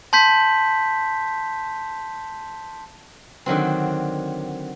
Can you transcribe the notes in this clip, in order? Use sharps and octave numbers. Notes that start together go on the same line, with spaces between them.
A5 C6 G6 B6
D3 D#3 F#3 C4